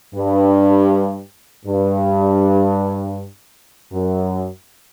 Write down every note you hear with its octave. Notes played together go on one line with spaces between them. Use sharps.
G2
G2
F#2